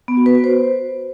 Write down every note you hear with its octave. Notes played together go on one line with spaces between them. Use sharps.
B3
F#4
B4
F#4
C5